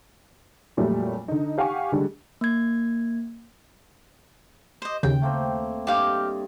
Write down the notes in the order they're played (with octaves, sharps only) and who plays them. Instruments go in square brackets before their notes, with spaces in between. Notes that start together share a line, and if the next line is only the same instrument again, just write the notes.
[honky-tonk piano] F2 A#2 F#3 G3 A3
D3 D#4
G4 F5 F#5 G#5 C#6
D3 G3 G#3
[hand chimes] A#3 G#6
[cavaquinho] C5 D#5
[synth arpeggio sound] D#2 C#3 [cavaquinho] G5
[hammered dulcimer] A3 A#3 C4
[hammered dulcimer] G2 D#5 [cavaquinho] G4 F5 G5